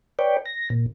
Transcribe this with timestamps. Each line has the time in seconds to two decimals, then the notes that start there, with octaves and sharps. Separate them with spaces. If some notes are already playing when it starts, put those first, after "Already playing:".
0.19 B4 C#5 D5 G5
0.46 A#6
0.70 A#2